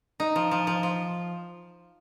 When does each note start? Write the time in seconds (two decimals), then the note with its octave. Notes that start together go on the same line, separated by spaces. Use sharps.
0.20 D#4
0.36 F3
0.51 F3
0.67 F3
0.83 F3